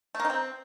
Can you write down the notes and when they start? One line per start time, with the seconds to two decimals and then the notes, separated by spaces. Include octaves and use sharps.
0.15 A3
0.20 A#3
0.25 D#4
0.30 C4